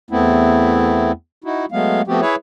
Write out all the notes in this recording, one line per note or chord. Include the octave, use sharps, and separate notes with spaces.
E2 A3 B3 C4 E4
D#4 E4 F#4
F#3 G#3 A3 B3 F5
F3 A3 B3 C4 F#4 G4
E4 G#4 B4 C#5 E5